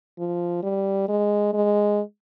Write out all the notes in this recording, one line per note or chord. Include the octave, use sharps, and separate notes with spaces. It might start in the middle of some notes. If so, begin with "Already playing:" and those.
F3
G3
G#3
G#3